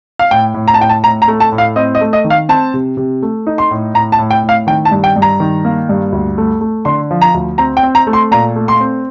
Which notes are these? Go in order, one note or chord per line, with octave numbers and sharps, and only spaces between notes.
F5
A2 G5
A2
A#5
A5
A2 G5
A5
A2 A#5
A#5
A3
A5
A2
F5
C4 D#5
D#5
A3
D#5
D#3
F5
C4 A5
C3
C3
A3
D#4
C6
A2
A2 A#5
A5
A2
G5
A2
F5
D#3 G5
A5
G2
G5
G2
A#5
D#3
A#3
G2
D2
A3
A3
D3 C6
F3
A#5
D2
C4 A#5
G5
C4
A#5
A3
C6
A#2 A#5
A3
C6
C4